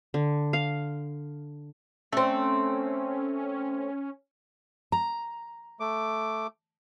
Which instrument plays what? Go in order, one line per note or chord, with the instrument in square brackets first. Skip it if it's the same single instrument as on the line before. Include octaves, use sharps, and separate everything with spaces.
[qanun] D3
F5
[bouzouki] A3 C4 [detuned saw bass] C#4
[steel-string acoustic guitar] A#5
[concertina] A3 D6